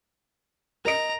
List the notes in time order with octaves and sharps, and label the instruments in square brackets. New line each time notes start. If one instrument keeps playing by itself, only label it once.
[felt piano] A#4 D#5 D7 [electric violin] A#5